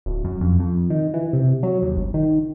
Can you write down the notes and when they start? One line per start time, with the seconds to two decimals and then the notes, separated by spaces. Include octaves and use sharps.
0.06 D1
0.24 F#2
0.41 F2
0.59 F2
0.90 D#3
1.14 E3
1.33 C3
1.63 F#3
1.82 D#2
1.97 G1
2.14 D#3